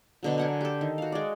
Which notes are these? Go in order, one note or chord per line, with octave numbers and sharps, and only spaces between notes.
B2 D3 F#3
A#4 F#5 G#5
G4 A4
D#3
F#4 F5
G#3 D5